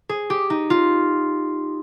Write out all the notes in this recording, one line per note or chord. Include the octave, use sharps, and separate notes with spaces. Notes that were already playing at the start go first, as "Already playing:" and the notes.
G#4
G4
D#4
F4